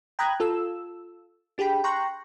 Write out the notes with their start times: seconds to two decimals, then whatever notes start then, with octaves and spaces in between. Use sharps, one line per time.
0.19 G5 A#5 B5 D#6 F#6 G#6
0.40 F4 A4 E6
1.58 D4 G4 G#4 G5 B5
1.84 G5 A#5 C6 C#6 F#6 A#6